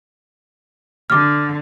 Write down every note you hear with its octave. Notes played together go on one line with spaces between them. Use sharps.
D3 D6 F6